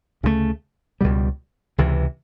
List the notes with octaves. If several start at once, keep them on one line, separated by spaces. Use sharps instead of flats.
D2 C#3 F3 A3
C#2 B2 G3
C#2 C3 E3